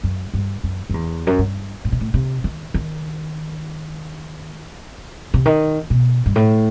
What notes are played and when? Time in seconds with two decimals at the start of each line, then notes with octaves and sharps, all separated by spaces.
0.03 F#2
0.34 G2
0.63 F#2
0.90 F#2
0.94 E2
1.27 F#2
1.39 G2
1.85 A2
1.92 B2
2.00 A2
2.14 C3
2.44 D#3
2.74 D#3
5.34 C3
5.46 D#3
5.90 B2
6.26 G2
6.36 A2